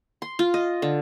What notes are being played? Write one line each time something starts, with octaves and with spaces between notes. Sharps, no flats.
C6
F4
D#5
D3